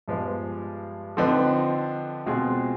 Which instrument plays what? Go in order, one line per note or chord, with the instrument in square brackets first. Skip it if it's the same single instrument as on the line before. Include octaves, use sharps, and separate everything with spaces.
[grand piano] G2 F3 G#3 B3
D3 F3 C4 D#4 B4
B2 G#3 C4 F4 G#4